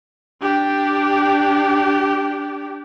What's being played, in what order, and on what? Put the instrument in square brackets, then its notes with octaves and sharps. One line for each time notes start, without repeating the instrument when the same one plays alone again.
[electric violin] D4 G4